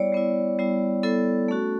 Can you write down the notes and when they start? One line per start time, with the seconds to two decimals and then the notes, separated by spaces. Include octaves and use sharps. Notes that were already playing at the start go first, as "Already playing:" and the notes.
Already playing: G3 B3 E4 C#5 D5
0.12 G3 B3 E4
0.59 G3 B3 E4
1.03 G3 B3 E4 A4
1.48 A3 C#4 F#4